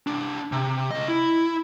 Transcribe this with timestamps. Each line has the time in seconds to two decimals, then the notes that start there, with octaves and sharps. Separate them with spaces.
0.07 C2 D4
0.52 C3
0.91 C#3 D#5
1.08 E4